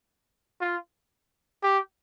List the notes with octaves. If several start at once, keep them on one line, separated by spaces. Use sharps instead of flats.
F4
G4